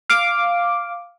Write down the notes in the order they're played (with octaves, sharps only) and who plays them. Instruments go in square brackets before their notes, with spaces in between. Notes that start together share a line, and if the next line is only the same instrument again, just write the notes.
[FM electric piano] F5 D6